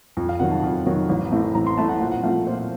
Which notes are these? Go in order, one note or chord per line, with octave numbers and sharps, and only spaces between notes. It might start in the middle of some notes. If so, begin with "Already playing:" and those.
F2
F5
C3 D#3 F#3 F#5
A5
F2
C3 D#3 F#3
A1
A2 A3 C4
A1 A#5
C6
A2 A3 C4 A5
F#5
A#2 F#5
F#5
F3 A3 C4 F4 F5
A#2 C5